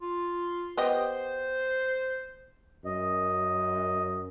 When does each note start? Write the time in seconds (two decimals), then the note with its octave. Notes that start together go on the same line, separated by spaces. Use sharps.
0.02 F4
0.77 B3 G4 C5 D#5
2.85 F#2 D#5